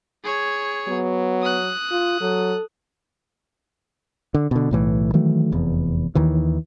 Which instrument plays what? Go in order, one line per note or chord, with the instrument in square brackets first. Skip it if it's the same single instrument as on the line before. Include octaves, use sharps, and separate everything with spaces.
[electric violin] G#4 C#5
[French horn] F#3 [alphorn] B3
[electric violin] D#6 F#6
[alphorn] F4
[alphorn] F#3 [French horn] A4
[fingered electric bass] D3
B2 D3
B1 A2 E3
D#3 E3 F#3 A3
F1 E2
D#2 D#3 E3